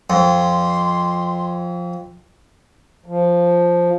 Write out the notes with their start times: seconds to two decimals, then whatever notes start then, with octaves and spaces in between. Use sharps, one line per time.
0.10 F2 C6
3.06 F3